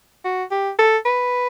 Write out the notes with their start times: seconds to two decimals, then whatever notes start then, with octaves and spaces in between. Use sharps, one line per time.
0.25 F#4
0.52 G4
0.79 A4
1.06 B4